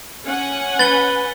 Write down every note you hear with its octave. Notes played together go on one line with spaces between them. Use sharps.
C#4 F#5 G#5
B4 A6 G7